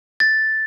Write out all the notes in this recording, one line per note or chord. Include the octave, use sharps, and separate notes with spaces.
A6